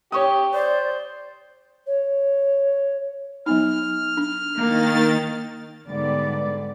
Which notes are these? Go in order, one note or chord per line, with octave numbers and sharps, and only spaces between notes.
G4 C#5 C#6 D#6
C5 D5
C#5
F#3 B3 D#4 F6
D4
D#3 A#3 A6
G#2 D3 G3 B3 D5